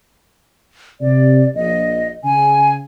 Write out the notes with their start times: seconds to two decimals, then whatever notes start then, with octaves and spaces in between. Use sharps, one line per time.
1.01 C3 D5
1.55 A#1 D#5
2.24 C#3 G#5